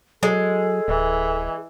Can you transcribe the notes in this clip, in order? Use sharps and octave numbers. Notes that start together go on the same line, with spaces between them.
F#3 G#3 A4
D1 E3